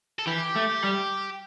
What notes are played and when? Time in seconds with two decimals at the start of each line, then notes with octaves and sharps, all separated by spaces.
0.19 A4
0.27 E3 G4
0.56 A3
0.84 G3